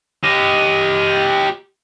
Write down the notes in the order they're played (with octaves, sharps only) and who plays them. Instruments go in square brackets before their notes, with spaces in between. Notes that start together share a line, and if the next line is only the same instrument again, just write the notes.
[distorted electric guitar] G4 D#5